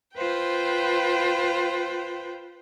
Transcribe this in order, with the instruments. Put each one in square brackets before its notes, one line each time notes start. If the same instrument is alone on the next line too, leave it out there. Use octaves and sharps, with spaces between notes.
[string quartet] F4 B4 C5 G5